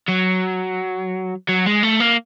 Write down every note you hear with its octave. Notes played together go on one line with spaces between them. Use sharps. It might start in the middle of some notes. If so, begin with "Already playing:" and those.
F#3
F#3
G#3
A3
A#3